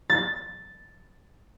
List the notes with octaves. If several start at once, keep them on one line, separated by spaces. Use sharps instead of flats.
A6